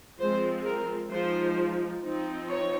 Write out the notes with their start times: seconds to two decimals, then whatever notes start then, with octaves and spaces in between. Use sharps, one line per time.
0.20 F3 G#3 C4 C5
0.66 A#4
1.12 F3 G#3 D#4 C5
2.03 F3 C4 D#4
2.50 C#5